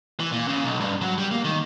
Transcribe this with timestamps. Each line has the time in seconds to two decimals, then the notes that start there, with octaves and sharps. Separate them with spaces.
0.20 E3
0.32 A#2
0.48 C#3
0.64 B1
0.80 G2
1.01 F#3
1.18 G3
1.31 A#3
1.45 D#3